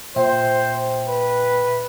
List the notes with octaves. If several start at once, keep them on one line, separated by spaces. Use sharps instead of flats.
A#2 C5 E5 G5
B4